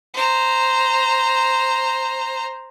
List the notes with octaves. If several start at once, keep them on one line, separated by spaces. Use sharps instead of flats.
C5 A#5